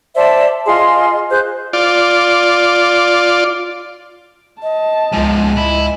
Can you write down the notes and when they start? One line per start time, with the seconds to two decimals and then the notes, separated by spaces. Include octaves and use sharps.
0.15 C5 D5 E5 A5
0.66 F4 G#4 D#5 C6
1.31 G#4 C5 F#6 G6
1.73 F4 D5
4.62 D#5 A5
5.13 C#2 G#2 F3 G#5
5.57 E4 D#5